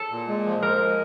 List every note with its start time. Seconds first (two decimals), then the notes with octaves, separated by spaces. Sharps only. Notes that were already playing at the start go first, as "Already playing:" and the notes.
Already playing: A4
0.10 A#2
0.28 G#3
0.46 F3
0.62 F3 A#4
0.80 G#3